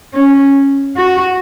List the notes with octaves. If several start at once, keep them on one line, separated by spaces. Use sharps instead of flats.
C#4
F#4